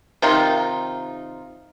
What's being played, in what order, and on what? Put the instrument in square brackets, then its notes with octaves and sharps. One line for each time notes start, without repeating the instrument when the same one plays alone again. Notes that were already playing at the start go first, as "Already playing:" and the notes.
[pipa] C3 D#3 D#4 F4